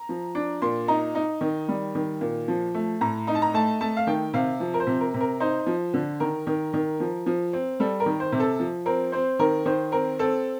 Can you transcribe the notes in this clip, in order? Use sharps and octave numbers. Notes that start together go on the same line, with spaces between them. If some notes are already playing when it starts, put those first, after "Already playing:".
Already playing: A#5
F3
D4
A#2 C6
D#4 A#5
D#4
D#3
G3
D#3
A#2
F3
A3
A2 A#5
D#4 A#5
A5
A#5
A3 A5
A3 A5
F5
D#3 G5
C3 F5
F3
A#4
C5
C3
A#4
C3
A#4
D#4 C5
F3
D3
D#3 A#4
D#3
D#3
F3
F3
C4
G3 A4
A#4
D#3
C5
C3
A4
F3
C4 A#4
C4 C5
D#3 A#4
D#3 C5
C4 A#4
C4 A4